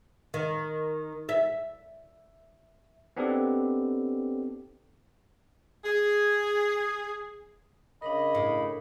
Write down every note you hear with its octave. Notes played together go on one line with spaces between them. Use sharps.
D#3
E5
B3 C4 D4 D#4 G4 A4
G#4
C#3 D4 A#4 D#5 B5
A2